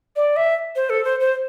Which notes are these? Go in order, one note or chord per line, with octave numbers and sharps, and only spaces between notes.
D5
E5
C5
A4
C5
C5